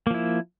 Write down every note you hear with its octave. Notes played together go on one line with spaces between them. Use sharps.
F3 A#3 E4